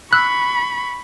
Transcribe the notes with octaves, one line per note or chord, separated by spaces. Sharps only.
B5 C#6 E6 F#6